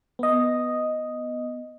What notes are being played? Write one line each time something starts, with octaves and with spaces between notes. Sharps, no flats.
B3 D#5